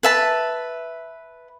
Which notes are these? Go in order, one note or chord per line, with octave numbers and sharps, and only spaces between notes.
B4 E5 A5